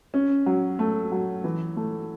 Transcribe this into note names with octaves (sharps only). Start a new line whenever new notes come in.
C#4
F#3
A3
F#3
E3
A3